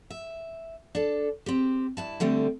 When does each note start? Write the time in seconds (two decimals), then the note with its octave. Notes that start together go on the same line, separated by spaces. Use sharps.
0.10 E5
0.95 D4 A4
1.46 C4 G4
1.97 G2 E4 A5
2.20 D3 G3 A3 C4